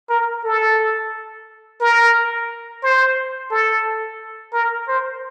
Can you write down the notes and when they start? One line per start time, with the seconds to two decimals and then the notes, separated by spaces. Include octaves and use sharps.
0.10 A#4
0.44 A4
1.80 A#4
2.83 C5
3.51 A4
4.53 A#4
4.88 C5